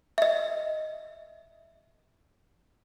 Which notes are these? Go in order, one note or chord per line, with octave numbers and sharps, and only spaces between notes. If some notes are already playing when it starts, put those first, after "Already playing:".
D#5 E5